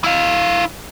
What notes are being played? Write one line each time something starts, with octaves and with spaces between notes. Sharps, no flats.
E4 F5